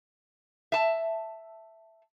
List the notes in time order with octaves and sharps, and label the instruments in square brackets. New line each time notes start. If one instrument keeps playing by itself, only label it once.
[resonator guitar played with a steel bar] E5 A5